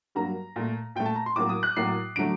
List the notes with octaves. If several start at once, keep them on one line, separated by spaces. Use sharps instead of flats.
G2 F#3 A#3 A#5
A#2 A3
A#2 A3 G5
A5
A#5
C6
A2 F#3 A#3 D6
D#6
F#6
A2 F#3 A#3 C7
D3 F#3 A3 D7